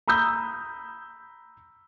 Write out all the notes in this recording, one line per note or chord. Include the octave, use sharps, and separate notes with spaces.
A#5 B5 D#6 E6 G6